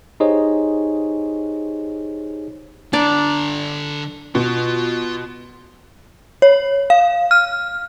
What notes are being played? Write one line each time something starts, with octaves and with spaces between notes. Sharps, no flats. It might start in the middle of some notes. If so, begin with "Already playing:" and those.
D#4 G4 G#4 C5 C#5 D#5
D3 D4 D5 A#5
B2 F4
C#5
F5
F6